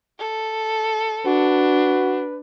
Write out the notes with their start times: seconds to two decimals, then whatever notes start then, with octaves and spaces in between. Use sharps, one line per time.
0.19 A4
1.26 D4 F#4 B4